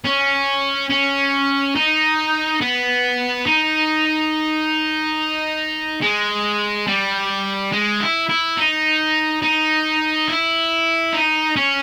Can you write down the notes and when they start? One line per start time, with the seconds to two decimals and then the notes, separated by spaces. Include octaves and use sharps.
0.04 C#4
0.90 C#4
1.75 D#4
2.61 B3
3.46 D#4
6.02 G#3
6.87 G3
7.72 G#3
8.00 E4
8.29 E4
8.57 D#4
9.42 D#4
10.28 E4
11.13 D#4
11.56 C#4